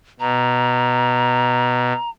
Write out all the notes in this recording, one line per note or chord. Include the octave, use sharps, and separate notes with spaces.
B2 A#5